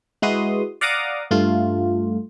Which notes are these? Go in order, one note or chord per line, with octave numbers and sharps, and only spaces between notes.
G#3 E4 F#4 B4 C6 D#6
D5 F5 F#5 A#5 D6 D#6
G2 A3 F4